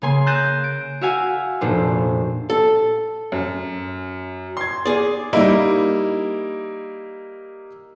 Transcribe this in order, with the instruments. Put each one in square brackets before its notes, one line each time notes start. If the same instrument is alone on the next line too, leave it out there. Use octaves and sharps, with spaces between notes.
[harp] C#3 A#3 G#5 C6 C7
F#6 G6 A6 A#6 D#7 E7
D7
F#4 E5 F5 G#5
F1 A#2 D4 C5
[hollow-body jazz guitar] A4
[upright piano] F#2
C6 G#6
[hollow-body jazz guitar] G#4 D5
[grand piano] G3 A#3 D#4 E4